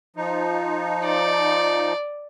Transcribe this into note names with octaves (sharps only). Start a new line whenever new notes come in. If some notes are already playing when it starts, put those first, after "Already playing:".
F3 D#4
D5